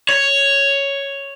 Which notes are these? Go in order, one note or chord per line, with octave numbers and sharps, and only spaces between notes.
C#5